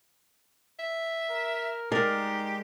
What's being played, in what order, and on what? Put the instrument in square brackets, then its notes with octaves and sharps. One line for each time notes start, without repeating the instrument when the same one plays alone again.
[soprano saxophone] E5
[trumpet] A#4
[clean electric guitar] G#3 [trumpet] D#4 [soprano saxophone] G4 [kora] A#4 D5 F5